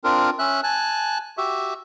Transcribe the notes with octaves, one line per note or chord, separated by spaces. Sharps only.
C4 D4 F4 A#4
C#4 E5 F#6
G#5 A5 F#6
F#4 G4 E5